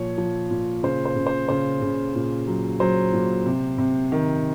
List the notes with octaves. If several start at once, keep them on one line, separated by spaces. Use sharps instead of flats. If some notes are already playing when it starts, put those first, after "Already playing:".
Already playing: A#2 F3 C#5
F3
A#2
C#3 C5
C5
C#3
C5
C#3 C5
C#3
A#2
F#3
F#3 C5
A#2
C3
C3
D#3